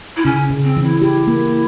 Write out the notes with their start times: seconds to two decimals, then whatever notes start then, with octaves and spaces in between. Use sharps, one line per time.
0.16 E4
0.25 C#3 C#4
0.50 C#3
0.64 C4
0.77 E3
0.83 E4
1.02 E4 G4
1.27 A#3